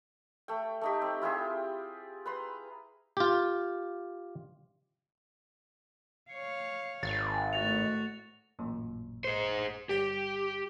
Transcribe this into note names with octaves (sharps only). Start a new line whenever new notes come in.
A3 G5
A3 D#4 G4
C4
E4 F4 G4 G#4
B4 A#5 C6
F4 G4
C#5 F5
G#1 A6
A2 F#4 A6 F7
A1 F#2 A#2
G#4 C5
G1 G3 G4 G5